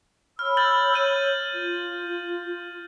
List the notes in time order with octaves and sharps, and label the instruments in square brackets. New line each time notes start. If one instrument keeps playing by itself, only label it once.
[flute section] C#5 B5 E6 [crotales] F6
[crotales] G6 A6 F#7
[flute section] C#5 [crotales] G6 D#7 F#7
[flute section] F4